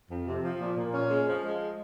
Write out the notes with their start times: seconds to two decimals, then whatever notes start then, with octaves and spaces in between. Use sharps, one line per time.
0.10 F2
0.26 C3
0.43 F3
0.60 A#2
0.77 A#2
0.93 C#4
1.11 G#3
1.27 F3
1.44 G#3